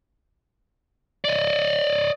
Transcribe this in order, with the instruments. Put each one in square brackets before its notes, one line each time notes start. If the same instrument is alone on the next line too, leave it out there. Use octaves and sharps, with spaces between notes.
[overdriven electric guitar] D5 D#5